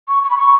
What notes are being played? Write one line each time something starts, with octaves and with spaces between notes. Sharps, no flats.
C#6
C#6
B5
C#6